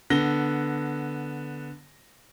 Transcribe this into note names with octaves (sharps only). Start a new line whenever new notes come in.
D3 B3 A#6 G7